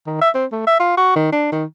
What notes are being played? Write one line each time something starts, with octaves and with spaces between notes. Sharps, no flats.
D#3
E5
C4
A3
E5
F4
F#4
D#3
D4
D#3